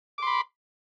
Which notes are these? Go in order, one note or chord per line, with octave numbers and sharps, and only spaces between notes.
B5 C6 D6